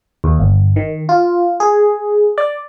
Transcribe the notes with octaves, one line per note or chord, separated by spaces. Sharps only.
D#2
G1
D#3
F4
G#4
D5